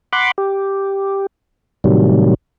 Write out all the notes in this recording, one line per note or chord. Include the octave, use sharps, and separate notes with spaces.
F#5 B5 C6 D6
G4
A2 C3 D#3 F#3 G3